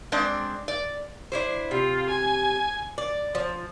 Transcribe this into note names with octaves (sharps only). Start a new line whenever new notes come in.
G#3 C4 D4 D5
D5
D4 E4 C5
C3 F4
G#5
D5
F3